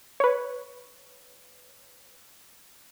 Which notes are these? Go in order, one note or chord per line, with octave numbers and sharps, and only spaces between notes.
B4 C#5